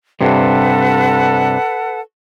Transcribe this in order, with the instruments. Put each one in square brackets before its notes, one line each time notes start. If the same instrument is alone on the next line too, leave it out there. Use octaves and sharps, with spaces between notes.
[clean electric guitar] G2 C3 [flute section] A4 B4 F#5